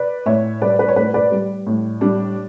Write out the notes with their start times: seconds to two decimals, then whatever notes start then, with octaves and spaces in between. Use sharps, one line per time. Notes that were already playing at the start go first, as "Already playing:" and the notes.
Already playing: B4 D5
0.26 A2 C#5 E5
0.61 G3 B4 D5
0.79 B4 D5
0.89 C#5
0.96 A2 B4 D5
1.14 B4 D5
1.32 G3
1.67 A2
2.01 G3 D4